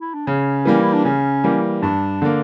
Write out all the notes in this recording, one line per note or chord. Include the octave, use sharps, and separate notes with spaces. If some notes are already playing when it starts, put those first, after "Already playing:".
E4
D4
C#3 C#4
E3 G3 A#3
E4
D4
C#3 C#4
E3 G3 A#3
G2 D4
D3 A#3